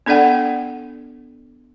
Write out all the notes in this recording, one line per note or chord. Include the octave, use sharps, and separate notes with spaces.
B3 D4 A4 D5 F#5 G5